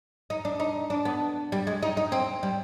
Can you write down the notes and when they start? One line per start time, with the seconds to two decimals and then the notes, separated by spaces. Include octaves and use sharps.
0.30 D#4
0.45 D4
0.60 D#4
0.90 D4
1.05 B3
1.52 G3
1.67 G#3
1.83 D#4
1.97 D#4
2.12 C4
2.43 G3